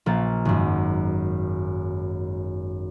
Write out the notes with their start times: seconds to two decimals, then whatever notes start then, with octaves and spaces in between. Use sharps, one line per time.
0.06 A#1 A#3 C#4 A6
0.45 G#1 F#2